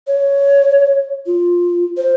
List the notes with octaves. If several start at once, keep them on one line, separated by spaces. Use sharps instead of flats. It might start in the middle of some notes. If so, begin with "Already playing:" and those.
C#5
F4
C5